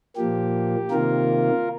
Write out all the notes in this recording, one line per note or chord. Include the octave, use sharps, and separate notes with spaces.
A#2 F3 A#3 G4
C3 D#3 A#3 F4 A#4